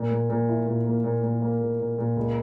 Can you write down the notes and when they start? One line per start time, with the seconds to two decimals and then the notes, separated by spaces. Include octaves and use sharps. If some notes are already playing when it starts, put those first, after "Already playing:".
Already playing: A#2
0.11 A#2
0.30 A#2
0.49 E4
0.67 A#2
0.86 A#3
1.04 A#2
1.23 A#2
1.42 A#3
1.61 A#2
1.80 A#2
1.98 A#2
2.17 C#2